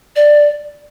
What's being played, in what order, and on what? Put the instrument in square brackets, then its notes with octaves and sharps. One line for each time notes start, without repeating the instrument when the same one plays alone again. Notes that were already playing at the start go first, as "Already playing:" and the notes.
[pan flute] D5